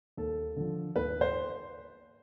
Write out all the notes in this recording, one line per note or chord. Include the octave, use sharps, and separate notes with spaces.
D#2 A4
D3 F3
D#2 B4
C5